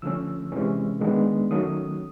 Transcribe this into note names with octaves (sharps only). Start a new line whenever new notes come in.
D3 F3 A3 C#4 E6
C3 E3 G#3 C#4
D#3 G#3 B3 D4
D#3 F#3 A3 C#4 D#6